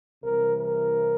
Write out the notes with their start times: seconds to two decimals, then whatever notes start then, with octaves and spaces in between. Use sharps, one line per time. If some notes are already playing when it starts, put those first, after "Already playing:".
0.24 C2 C3 E3 A#4
0.59 A#4